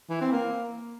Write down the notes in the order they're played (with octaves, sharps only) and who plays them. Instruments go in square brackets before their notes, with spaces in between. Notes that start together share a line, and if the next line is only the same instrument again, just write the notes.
[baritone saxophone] E3
C4
A#3